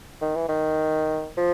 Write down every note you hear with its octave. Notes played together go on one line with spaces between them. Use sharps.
D#3
E3
D#3
F3